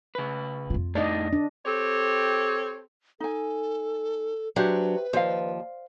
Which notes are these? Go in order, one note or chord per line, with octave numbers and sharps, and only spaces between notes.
C#3 B4
F2 F4
A2 D4 D#4 D5 D#5
D4
C4 G4 A4 C#5
D#4 A4 G#5
F#3 D4 G4 B4 C5 E5
D#2 F3 C5 D5 F5